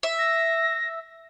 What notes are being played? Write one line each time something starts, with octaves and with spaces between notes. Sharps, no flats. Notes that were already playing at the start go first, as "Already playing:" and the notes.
E5
A#6